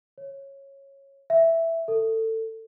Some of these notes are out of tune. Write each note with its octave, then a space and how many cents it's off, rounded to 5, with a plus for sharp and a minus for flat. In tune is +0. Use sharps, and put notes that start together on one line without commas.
C#5 -10
E5 +5
A4 +20